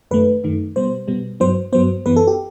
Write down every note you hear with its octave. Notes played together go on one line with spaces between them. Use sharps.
F#2 D#3 A3 B4
F#2 D#3 A3
B2 G3 B3 C5
B2 G3 B3
G2 F#3 B3 C5
G2 F#3 B3 C5
F#2 E3 B3 B4
A4
G4